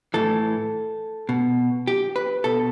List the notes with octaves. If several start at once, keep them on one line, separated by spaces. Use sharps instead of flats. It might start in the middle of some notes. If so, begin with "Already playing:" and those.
A2 E3 A4
B2
G4
B4
B2 A4